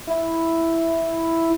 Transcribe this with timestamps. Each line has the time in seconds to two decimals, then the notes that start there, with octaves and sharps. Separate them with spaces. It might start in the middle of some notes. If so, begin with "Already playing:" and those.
0.07 E4